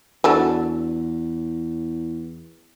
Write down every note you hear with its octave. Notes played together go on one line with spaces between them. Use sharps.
E2 F#3 D4 A4